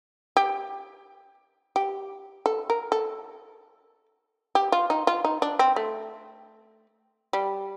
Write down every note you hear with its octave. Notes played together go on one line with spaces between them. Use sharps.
G4
G4
A4
A#4
A4
G4
F4
D#4
F4
D#4
D4
C4
A3
G3